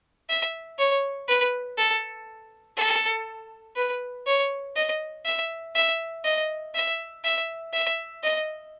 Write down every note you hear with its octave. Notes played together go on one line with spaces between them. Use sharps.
E5
C#5
B4
A4
A4
B4
C#5
D#5
E5
E5
D#5
E5
E5
E5
D#5